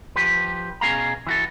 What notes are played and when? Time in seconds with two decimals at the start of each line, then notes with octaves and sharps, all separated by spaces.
0.16 F3 G4 B4
0.81 B2 C#4 G#4 F5 A#5
1.27 E3 F#4 A4